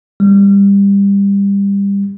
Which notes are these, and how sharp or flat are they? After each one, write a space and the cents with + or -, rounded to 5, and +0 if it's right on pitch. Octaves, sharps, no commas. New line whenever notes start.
G3 +25